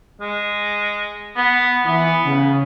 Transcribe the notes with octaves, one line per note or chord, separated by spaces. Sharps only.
G#3
B3
E3 B3
C#3